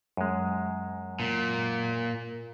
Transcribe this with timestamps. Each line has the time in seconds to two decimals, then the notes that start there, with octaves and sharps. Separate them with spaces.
0.17 F#2 G#3
1.20 A#2